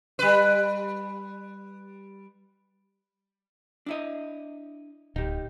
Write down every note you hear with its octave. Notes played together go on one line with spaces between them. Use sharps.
G3 B4
D4 E4 D#5
D1 D#4 G4